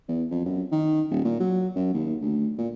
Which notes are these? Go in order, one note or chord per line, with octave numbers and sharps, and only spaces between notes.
E2
F2
F#2
D#3
D#1
A#2
F#3
F#2
D#2
D2
A#2